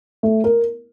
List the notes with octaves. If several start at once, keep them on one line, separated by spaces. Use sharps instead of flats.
A3
A#4